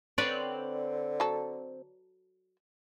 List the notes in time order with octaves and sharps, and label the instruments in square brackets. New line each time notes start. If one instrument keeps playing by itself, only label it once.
[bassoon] D3 [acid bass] C4 [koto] B4 C#5 D5
[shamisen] F#3 A4